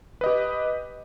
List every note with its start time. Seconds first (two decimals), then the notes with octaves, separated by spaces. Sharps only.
0.21 B4
0.24 D#5
0.26 G4